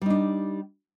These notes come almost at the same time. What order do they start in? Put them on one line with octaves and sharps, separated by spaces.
G3 D#4 D4